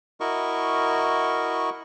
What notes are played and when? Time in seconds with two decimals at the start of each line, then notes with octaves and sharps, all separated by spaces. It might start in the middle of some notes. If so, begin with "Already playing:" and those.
0.20 E4 F#4 A#4 D#5 C#6